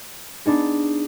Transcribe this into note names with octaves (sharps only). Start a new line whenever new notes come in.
B3 D4 D#4 G#4